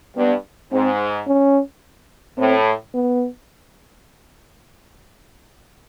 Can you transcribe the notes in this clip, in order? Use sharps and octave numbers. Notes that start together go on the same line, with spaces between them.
G2 B3
G#2 C4
C#4
A2 C4
B3